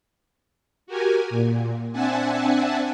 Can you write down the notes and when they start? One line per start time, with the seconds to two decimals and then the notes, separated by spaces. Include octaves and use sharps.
0.87 F#4 G4 A#4 G#5
1.30 A#2
1.93 C4 D4 E5 F#5 G#5 A5